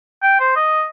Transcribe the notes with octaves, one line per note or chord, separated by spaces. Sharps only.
G5
C5
D#5